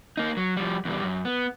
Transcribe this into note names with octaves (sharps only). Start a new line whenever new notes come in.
A#3 D#4
F#3
F3 G3
E2 G3
F#2
B3